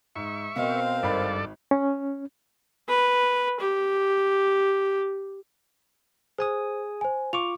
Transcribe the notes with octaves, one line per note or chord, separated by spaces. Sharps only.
G#2 E5 C#6
B2 C4 A#4 C5 D#5 F5
G#1 G2 A4 D5 B5
C#4
B4
G4
G#4 C5 G#5 D#6
C5 G#5
F4 C#6 D6 F7